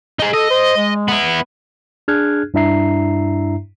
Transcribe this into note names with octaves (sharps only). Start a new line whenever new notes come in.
D#4 G#4
A4 D#5
C5
G#3
B3 E4
D4 G#4 F6 F#6 G#6
G2 D4 E4 E5 A#5 C7